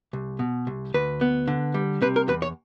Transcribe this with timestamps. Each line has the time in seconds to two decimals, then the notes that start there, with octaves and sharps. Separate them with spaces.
0.13 C2
0.39 B2
0.67 C2
0.94 D2 B4
1.21 B3
1.47 D3
1.74 G3
2.01 C3 B4
2.16 A#4
2.28 E2 B4
2.42 C#5